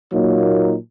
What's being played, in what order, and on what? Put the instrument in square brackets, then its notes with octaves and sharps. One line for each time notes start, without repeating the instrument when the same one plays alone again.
[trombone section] A#2 F#3 A#3 D#4